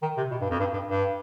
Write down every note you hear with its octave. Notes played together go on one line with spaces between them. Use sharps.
D#3
C3
B2
G2
F2
G2
G2
G2